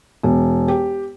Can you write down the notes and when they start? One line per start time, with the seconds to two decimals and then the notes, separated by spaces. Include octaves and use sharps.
0.23 E1
0.68 G4